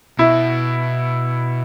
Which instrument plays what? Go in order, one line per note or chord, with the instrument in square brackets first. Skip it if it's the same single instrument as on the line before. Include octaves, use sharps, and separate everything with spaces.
[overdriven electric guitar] B2 [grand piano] E4